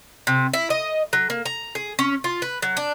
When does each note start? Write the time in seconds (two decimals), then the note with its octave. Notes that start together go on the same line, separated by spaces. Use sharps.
0.27 C3
0.54 E4
0.70 D#5
1.13 F#3
1.30 A#3
1.46 A#5
1.75 G#4
1.99 C#4
2.24 F4
2.42 B4
2.62 F#3
2.77 D4